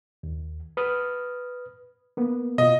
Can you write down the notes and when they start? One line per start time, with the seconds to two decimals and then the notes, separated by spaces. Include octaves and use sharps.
0.23 D#2
0.77 B4 D#6 F6
2.17 A#3 B3
2.58 B2 F4 D#5